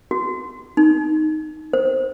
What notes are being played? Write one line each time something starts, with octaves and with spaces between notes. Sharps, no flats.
F#4
D#4
C5